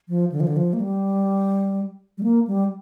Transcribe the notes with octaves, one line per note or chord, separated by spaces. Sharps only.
F3
D3
F3
D3
F3
A#3
G3
G3
A#3
G3